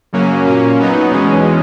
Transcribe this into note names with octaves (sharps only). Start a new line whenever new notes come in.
F#2 C#3 F#3 A#3 C#4
A#2 A#3 C#4
F#3 B3 D#4
E2 B2 G#3 C#4